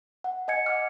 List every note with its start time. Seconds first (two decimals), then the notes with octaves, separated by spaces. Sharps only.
0.24 F#5
0.48 D#5 G#5 G#6 C#7
0.66 F#5 D6 F6